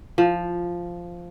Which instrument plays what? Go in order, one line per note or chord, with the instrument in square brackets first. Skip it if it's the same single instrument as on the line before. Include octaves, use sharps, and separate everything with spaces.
[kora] F3